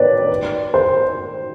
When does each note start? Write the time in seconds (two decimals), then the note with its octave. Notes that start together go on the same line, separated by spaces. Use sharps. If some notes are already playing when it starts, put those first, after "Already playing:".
Already playing: B4 C#5 D5
0.74 C5